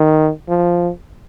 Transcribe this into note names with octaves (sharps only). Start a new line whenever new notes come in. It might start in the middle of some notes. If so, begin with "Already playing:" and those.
Already playing: D#3
F3